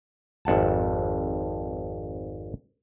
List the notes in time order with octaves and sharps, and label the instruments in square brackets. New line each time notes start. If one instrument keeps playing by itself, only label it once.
[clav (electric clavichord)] G#1 F2 F#5 A5